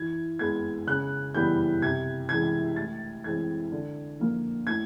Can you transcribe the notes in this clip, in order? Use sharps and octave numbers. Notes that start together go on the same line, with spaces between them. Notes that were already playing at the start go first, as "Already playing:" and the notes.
Already playing: E3 G#6
G#3 B3 G#6
C#3 F#6
E3 G3 B3 G6
C3 G#6
E3 G#3 G#6
A2 A6
E3 G#3 C4 G#6
D3
F3 A#3
A2 G#6